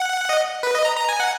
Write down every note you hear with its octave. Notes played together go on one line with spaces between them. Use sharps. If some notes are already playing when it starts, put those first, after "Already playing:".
Already playing: F#5
D#5
B4
D#5
A#5
A#5
G#5
F#5